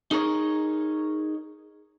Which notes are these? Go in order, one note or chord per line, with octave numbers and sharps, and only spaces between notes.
D#4 G#4 A#4 C#5